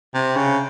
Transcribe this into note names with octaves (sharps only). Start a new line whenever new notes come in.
C3
C#3